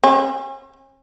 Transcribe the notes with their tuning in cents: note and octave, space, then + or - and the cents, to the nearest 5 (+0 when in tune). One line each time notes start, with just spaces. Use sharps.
C#4 -40